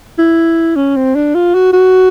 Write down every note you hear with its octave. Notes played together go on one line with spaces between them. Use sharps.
E4
C#4
C4
D4
F4
F#4
F#4